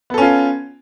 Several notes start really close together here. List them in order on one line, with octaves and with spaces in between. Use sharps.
B3 A4 C#4 F4